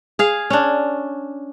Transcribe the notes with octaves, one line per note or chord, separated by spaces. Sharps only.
G#4 F5
C#4 D4